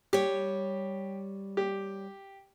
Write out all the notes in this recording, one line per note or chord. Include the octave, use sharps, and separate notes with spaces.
G3 G4 C#5
G4